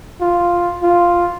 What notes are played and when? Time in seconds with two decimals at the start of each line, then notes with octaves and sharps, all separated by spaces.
0.21 F4
0.83 F4